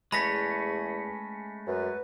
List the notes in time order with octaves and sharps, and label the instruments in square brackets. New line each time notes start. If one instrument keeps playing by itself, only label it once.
[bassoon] E2 [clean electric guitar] G#3 A3 C#4 [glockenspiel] B5 A#6 B6
[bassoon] F#2 [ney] B4